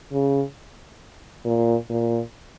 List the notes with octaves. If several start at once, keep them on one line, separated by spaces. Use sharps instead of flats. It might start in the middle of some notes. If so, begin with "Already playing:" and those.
C#3
A#2
A#2